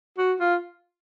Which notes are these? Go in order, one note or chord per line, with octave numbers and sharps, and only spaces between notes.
F#4
F4